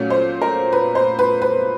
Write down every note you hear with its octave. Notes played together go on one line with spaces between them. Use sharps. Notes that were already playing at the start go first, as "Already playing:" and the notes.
Already playing: A#2 F#3 A3 C#4
C5
A#4
B4
C5
B4
B4